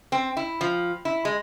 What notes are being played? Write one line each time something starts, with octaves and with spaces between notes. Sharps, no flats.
C4
E4
F3
E4
G#3